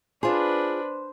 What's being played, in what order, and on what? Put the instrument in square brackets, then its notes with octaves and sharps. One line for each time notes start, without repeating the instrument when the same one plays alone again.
[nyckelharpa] D4 B4 [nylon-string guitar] F4 G#4 [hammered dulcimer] C5